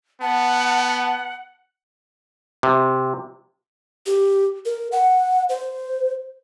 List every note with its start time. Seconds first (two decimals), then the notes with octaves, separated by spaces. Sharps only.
0.22 B3 F#5 A5
2.63 C3
4.06 G4
4.65 A#4
4.92 F#5
5.49 C5